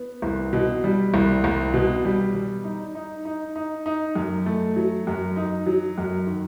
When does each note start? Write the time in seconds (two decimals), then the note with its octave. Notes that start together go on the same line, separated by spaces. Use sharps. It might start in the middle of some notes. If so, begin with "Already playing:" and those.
Already playing: B3
0.22 C2
0.53 B2
0.84 G3
1.14 C2
1.44 C2
1.73 B2
2.05 G3
2.35 G3
2.64 D#4
2.95 D#4
3.25 D#4
3.56 D#4
3.86 D#4
4.15 F#2
4.46 A3
4.76 F#3
5.07 F#2
5.36 D#4
5.66 F#3
5.98 F#2
6.27 D#3